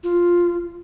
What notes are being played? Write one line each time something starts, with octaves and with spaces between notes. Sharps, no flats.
F4